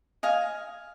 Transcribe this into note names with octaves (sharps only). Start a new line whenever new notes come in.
D#5 F5 G#5